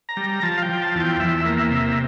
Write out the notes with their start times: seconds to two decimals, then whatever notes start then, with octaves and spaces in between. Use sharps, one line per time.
0.09 A#5
0.17 G3
0.42 F3 A5
0.58 F5
0.62 G5
0.69 F3
0.82 A5
0.95 E2
1.00 G5
1.20 E2 E5
1.46 A#3
1.58 E5
1.71 C3